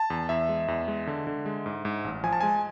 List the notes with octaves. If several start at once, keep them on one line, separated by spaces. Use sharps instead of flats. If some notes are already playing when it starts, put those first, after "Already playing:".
Already playing: A5
E2
E2 E5
G#3
E2
G#3
D3
D3
G#3
G#2
G#2
A1
F3 G#5
A5
G#3 G#5